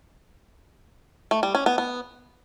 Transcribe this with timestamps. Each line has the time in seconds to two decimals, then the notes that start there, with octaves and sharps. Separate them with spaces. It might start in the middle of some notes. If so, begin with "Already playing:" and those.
1.31 A3
1.43 G3
1.55 C#4
1.66 B3
1.78 B3